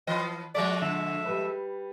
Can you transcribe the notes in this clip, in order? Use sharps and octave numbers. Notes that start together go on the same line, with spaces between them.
E3 B4 D#5
F3 G#3 A3 D5 B6
D3 E5
G3 B4